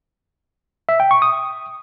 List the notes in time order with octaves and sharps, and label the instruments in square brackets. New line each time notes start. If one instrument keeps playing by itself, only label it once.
[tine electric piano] E5
G5
C#6
D#6